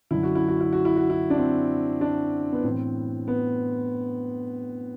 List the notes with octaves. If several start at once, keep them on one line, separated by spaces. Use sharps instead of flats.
F#2 D3 E4
F#4
E4
F#4
E4
F#4
E4
F#4
E4
D4
C4
D4
B3
A2 E3 C4
B3